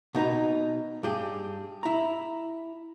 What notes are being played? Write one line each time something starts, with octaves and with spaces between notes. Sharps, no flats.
B2 D#4 B4 A#5
G2 G4 G#4
E4 A#5